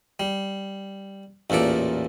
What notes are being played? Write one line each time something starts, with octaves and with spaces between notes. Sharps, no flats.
G3
A1 E2 A#2 A4 D6